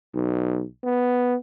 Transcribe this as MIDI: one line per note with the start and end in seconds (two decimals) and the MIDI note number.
0.14 0.63 35
0.84 1.35 59